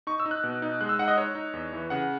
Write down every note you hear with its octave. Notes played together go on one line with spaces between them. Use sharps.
D#4 C#6
E6
D#4
F#6
B2
D#4
G#3 F#6
E6
D#4 F#5
D#5
D#4 C#5
D#4
E2
E3
C#3 F#5